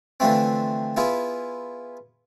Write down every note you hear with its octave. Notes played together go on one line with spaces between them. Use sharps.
D3 E3 F3 A3 C4
B3 E4 F4 G#4